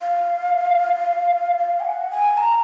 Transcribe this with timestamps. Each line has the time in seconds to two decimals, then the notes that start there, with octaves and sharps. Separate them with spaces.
0.02 F5
1.59 F5
1.80 G#5
1.85 F#5
2.11 G#5
2.37 A#5